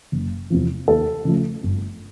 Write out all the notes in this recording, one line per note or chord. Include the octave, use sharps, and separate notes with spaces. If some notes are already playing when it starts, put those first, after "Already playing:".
F#1
E2 C3 F3
D#2 A4
C#3 F3 A3
G1